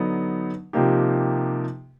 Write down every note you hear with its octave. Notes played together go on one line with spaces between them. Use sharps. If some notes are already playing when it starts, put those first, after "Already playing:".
Already playing: D3 F#3 B3 D#4
C3 F3 A#3 D#4 G4